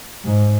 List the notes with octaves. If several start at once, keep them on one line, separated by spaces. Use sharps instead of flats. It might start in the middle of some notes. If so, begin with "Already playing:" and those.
G#2